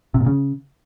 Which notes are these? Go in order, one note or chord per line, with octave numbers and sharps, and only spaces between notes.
C3
A#2
C#3